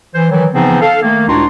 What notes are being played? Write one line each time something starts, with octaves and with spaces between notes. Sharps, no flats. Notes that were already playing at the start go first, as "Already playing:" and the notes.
E3 C5
D#3 E3 F#3
C#3 E3 F3 B3 C4 D#4
A4 F5
D#3 A3 A#3
C#2 A2 D4 D#4 F#4 C6